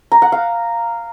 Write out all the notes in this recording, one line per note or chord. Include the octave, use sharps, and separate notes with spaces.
A#5
F#5
F5